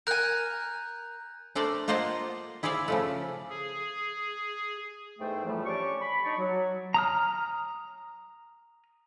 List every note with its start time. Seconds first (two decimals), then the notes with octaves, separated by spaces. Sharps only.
0.07 A#4 G#5 F#6 G6
1.55 A3 D4 A#4 C5 D5
1.88 A#3 F4 C5 D#5 F#5 A5
2.63 E4 G#4 C5 D5 E5 F5
2.88 C#3 F3 A3
3.50 G#4
5.19 E2 G#2 A3 A4 C5 G5
5.44 F2 A2 E3 F3 G3 A3
5.65 C#4 D4 G4 D5 C#6
6.01 B5
6.24 D4 D#4 D5 A#5 C#6
6.38 F#3
6.94 A#5 D#6 F6